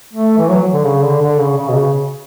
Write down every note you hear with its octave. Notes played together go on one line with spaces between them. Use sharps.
A3
E3
F#3
D3
C#3
D3
D3
C#3
C#3
B2
C#3